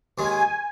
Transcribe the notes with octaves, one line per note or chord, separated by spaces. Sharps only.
D#2 D#3 G#3 G#5